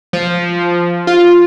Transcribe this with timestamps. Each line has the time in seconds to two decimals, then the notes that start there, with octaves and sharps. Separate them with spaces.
0.13 F3
1.07 F4